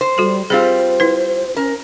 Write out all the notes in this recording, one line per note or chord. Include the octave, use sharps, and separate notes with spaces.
C5
G3 F#4 A4
G3 C4 F4 G#4 C5
E4 B4
C#4 A#4